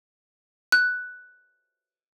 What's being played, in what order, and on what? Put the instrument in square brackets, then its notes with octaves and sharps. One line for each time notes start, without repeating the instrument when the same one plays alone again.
[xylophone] F#6